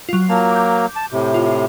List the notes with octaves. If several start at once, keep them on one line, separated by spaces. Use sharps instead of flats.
F#3 F4
F#3 A#3 A5
D6 G6
A5
A2 C3
F4